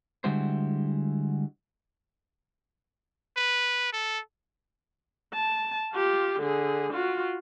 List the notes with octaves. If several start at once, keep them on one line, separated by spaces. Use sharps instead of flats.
D3 G3 G#3 E4 F#4 C5
B4
A4
A5
F4 G4
D3 G#4
F4 F#4